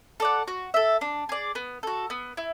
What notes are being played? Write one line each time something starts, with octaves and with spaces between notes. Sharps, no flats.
A4 D5 F#5
F#4
A4 E5
D4
G#4 D5
B3
F#4 A4
B3
E4